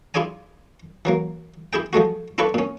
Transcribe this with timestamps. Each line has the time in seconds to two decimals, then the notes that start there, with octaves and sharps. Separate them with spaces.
0.14 E4 F4 G#4 D5 G#5
1.05 E3 F#3 A#3
1.73 E4 G4 G#4 G5
1.93 F3 G#3 A3 F#4
2.38 E4 F4 A4 B4 D5 C#6
2.54 A#2 C#4